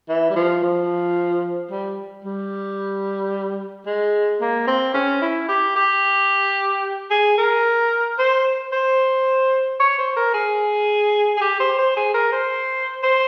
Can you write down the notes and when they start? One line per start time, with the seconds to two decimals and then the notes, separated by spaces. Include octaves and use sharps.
0.09 E3
0.30 G3
0.36 F3
0.63 F3
1.71 G3
2.25 G3
3.86 G#3
4.41 A#3
4.67 C4
4.94 C#4
5.22 E4
5.49 G4
5.76 G4
7.11 G#4
7.38 A#4
8.19 C5
8.73 C5
9.80 C#5
9.98 C5
10.17 A#4
10.34 G#4
11.37 G#4
11.41 G4
11.60 C5
11.79 C5
11.97 G#4
12.14 A#4
12.32 C5
13.03 C5